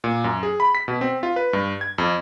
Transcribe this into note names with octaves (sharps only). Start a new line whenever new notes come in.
A#2
F#2
G#4
B5
B6
B2
C4
F4
B4
G2
G#6
F2